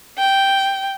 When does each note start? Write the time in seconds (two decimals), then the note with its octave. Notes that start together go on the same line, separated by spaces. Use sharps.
0.18 G5